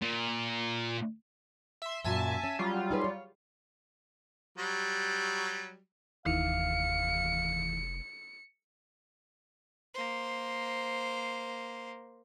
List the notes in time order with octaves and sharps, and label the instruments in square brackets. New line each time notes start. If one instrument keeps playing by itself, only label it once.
[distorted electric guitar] A#2
[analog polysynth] E5 C6
[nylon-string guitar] F#2 A#2 F#3 [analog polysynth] E5 G#5 A5
[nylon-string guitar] C#4
[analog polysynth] F#3 G3 F4
[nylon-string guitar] D#4 G#4 B4
C#5
[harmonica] F#3 G3
[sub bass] F1 [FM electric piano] D#2 E3 [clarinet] F5 [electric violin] C#7
[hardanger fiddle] A#3 C5